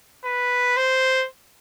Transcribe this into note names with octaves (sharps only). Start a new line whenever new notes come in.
B4
C5